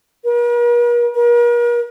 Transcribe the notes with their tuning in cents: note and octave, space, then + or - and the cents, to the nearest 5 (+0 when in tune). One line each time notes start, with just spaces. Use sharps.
A#4 +45
A#4 +40